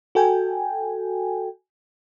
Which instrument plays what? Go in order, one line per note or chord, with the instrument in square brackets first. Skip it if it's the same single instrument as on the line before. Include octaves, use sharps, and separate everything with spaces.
[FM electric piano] F#4 A4 G5 G#5